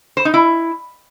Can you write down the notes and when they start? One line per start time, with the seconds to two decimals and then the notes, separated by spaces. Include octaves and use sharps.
0.17 C5
0.25 D#4
0.34 E4